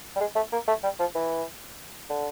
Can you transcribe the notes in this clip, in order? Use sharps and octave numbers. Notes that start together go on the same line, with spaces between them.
G3
G#3
A3
A#3
A3
G3
F3
E3
D3